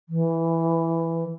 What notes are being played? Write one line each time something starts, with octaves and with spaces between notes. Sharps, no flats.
E3